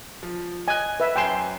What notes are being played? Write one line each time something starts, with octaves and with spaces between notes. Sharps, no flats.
F3
D#5 G#5 F#6
B4 E5
F#2 G5 G#5 C6 E7